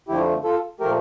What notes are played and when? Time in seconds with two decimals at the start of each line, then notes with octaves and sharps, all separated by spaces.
0.08 F2 D3 F3 A3 E4 G4
0.44 F4 A4
0.80 A#2 F3 A3 G4 A#4